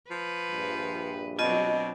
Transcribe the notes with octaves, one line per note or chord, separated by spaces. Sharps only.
F3 B4
A#1 G2
B2 F#3 C4 D4 F4 D#5